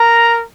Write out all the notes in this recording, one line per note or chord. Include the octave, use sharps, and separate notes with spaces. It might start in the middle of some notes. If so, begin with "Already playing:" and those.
Already playing: A#4 A#5